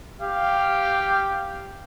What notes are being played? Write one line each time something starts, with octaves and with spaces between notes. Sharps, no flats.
G4 F5